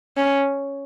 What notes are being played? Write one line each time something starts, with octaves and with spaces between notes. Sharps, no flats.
C#4